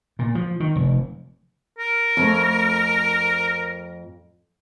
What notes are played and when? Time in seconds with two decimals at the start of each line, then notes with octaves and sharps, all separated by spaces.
0.19 A#2
0.35 F3
0.60 D#3
0.76 F1
1.78 A#4
2.17 F2 A3